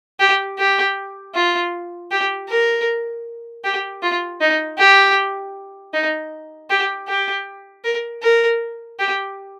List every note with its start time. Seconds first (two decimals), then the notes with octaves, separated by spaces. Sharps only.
0.20 G4
0.58 G4
1.35 F4
2.11 G4
2.49 A#4
3.64 G4
4.02 F4
4.41 D#4
4.78 G4
5.93 D#4
6.70 G4
7.08 G4
7.84 A#4
8.23 A#4
8.99 G4